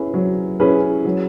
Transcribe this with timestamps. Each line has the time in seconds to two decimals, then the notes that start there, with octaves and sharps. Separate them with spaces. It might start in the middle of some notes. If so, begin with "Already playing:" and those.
Already playing: C#4 E4 G#4 B4
0.14 F#3
0.60 C#4 E4 G#4 B4
1.05 F#3